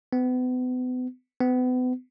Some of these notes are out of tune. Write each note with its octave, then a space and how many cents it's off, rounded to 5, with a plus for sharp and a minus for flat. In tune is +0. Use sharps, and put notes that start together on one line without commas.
B3 +35
B3 +35